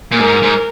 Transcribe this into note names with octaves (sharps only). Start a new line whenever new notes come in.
A#2
G#2 A#4
G#2